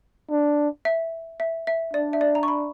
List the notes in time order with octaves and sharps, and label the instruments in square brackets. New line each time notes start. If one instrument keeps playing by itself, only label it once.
[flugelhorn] D4
[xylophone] E5
E5
E5
[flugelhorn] D4 [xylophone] D5
[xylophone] E5
D5
A#5
C#6
B5